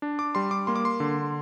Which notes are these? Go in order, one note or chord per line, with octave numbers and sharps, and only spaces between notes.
D4
D6
G3 C6
D6
A#3 C6
D6
C6
D3